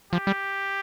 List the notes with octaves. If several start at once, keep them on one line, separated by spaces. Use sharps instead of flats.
F3 G4
G3